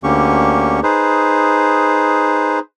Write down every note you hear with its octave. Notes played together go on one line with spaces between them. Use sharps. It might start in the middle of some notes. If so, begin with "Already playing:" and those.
D2 D3 A#3 C#4 G4 C#6
D#4 G#4 B4 C5